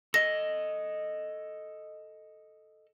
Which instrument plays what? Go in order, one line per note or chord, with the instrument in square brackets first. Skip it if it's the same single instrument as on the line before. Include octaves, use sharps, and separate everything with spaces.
[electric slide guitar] A4 D#5 [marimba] A#6